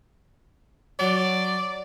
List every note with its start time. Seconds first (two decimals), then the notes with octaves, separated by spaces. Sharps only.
0.99 F#3 D5